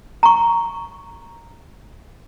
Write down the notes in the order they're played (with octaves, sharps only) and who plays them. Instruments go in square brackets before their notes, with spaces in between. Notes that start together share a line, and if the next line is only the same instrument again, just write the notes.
[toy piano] A#5 C#6